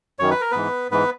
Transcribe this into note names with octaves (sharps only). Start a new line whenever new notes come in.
F#2 D#3 C#5
B4
A#4
G#2 E3 B3 B4
G#2 E3 B3 B4